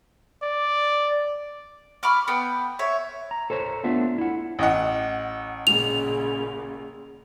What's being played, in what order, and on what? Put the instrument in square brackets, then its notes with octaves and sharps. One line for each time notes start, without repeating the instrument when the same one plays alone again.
[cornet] D5
[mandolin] B5 C#6 D6 F6
B3 G5
C#5 E5
[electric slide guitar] A#5
A4 C5 C#5 A#5
A3 B3 D4 F4 E5
E4 F#5
[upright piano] A1 D#5 F#5
[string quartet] A#2 C#3 [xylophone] F7